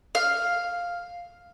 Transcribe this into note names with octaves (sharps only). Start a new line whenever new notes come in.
F5